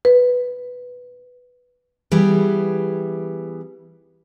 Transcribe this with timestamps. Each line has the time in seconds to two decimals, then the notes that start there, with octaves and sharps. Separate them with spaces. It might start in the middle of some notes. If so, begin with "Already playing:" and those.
0.05 B4
2.11 E3 G3 B3 G4 G#4